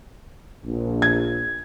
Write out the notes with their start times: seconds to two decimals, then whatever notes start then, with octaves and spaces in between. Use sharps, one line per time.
0.64 A#1
1.02 G#6